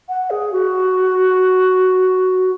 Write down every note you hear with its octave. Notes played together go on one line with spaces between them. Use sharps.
F#5
G#4
F#4